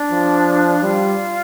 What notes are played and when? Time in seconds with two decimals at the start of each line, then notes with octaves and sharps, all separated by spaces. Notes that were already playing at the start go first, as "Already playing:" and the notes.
Already playing: D4
0.12 F3
0.82 G3 F4